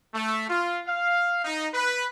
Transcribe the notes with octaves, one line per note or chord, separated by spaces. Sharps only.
A3
F4
F5
D#4
B4